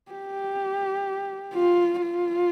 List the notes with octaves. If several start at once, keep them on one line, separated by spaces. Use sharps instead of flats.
G4
F4
F4